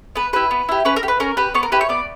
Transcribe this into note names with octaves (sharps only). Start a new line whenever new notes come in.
B3 B4
E4 G4 B4
B3
E4 G4
C#4 B4
A#4
G4
B4
C#4 A#4
G4 B4
B3 C#5
A#4
E4 G4 B4
C#5
B3 D5